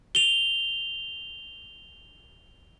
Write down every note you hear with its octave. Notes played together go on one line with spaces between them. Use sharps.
F7 G7